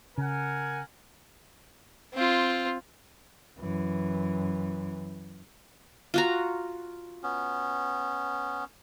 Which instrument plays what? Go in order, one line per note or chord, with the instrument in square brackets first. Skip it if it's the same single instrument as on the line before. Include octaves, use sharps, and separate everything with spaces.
[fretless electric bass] C#3 [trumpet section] A#4 F#5 G#5
[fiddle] C4 F4
[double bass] F#2 E3
[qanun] F4 F#4 A#5
[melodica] B3 C#4